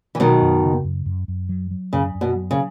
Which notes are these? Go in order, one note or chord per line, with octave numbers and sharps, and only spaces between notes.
E3
B2 D#3 F#3
F#2
C#3
F#2
F#2
F#2
F#3
F#3
F#2 C#3
F#2
B2
F#3
C#3